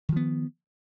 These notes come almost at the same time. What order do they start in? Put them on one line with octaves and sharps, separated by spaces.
D#3 F3 B3